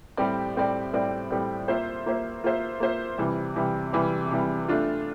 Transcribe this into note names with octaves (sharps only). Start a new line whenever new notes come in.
A2 G3 C4 G4 D5
A2 G3 C4 G4 D5
A2 G3 C4 G4 D5
A2 G3 C4 G4 D5
A#3 F4 C5 E5
A#3 F4 C5 E5
A#3 F4 C5 E5
A#3 F4 C5 E5
C3 E3 G3
C3 E3 G3
C3 E3 G3
C3 E3 G3
A3 D4 F4